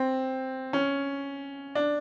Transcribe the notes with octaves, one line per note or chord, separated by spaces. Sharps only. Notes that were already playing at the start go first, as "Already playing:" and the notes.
Already playing: C4
C#4
D4